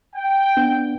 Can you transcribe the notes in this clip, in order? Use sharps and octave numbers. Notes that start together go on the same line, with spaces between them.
G5
B3 D4